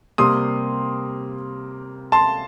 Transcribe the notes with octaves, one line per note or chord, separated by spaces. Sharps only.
C3 G3 A#3 C6 D#6
A5 C6